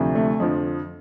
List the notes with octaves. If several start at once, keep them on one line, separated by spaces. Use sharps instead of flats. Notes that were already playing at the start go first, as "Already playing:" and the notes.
Already playing: D2 C3 F3
A3
F2 D3 F3